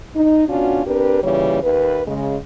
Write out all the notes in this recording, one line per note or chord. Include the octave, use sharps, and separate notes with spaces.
D#4
B2 C#4 D4 F4 F#4
C4 D4 G4 A#4 B4
A#2 C#3 E3 G3 C#5
D#2 B4
C#3 G#3